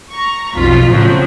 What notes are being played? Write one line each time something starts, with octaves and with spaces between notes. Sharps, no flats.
A#5 C#6
B1 F2 F4 B6
A2 C#3 F3 F#3 C4